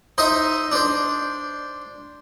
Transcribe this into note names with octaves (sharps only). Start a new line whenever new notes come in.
D#4 C5 D#5 E5
D4 C5